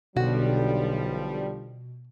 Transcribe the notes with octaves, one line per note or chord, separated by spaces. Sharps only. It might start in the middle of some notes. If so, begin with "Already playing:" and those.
B1 B2 D3 F3 G3 F#4